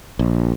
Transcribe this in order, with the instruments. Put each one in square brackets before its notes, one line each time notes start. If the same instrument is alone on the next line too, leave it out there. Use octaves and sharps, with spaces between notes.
[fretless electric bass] A#1